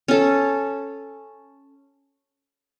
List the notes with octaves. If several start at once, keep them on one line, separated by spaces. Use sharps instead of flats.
C#4 A4